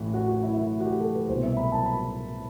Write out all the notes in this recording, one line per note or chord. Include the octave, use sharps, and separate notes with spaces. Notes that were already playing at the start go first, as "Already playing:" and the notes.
Already playing: A1 A2 E3
F#4
F#4
E4
E4
F#4
G4
A4
B4
C2 B2 C5
E5
B5
A5
B5